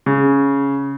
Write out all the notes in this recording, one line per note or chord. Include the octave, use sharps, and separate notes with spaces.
C#3